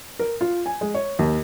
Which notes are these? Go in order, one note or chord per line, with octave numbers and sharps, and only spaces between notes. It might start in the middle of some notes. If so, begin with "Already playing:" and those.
A#4
F4
G#5
G#3
C#5
D#2